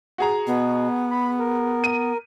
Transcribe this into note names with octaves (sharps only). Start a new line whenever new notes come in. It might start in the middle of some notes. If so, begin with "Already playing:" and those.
F#4 G#4 A#5
B2 B3
B5
A#4
D#7